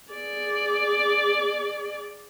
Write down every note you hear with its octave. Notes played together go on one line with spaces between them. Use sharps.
G#4 D5